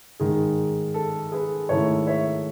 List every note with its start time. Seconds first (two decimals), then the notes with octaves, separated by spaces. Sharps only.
0.20 G#2 D#3 G#3 D#4 G#4
0.94 A4
1.32 G#4 B4
1.69 G#2 D#3 A3 E4 A4 C#5
2.07 C#5 E5